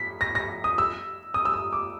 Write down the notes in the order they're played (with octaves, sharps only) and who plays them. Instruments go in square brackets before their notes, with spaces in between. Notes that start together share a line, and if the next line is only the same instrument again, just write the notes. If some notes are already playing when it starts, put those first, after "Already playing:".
Already playing: [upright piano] B6
A#6
A#6
D#6
E6
D#6
E6
D#6
D6